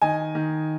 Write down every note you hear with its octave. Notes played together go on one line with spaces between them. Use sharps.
D#3 D#5 G#5
D#3